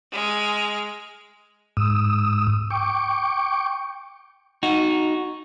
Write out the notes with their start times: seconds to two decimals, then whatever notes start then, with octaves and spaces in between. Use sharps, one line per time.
0.12 G#3 F6
1.77 G#2 D#6 E6
2.70 G5 C#6 D6
4.63 D#4 F#4